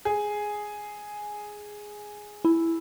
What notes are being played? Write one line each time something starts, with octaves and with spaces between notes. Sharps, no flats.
G#4
E4